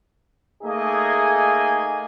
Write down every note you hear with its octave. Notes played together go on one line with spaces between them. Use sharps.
A3 A#3 D#4 G#4 D#5 G#5